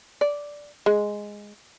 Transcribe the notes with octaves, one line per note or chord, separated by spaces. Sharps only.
D5
G#3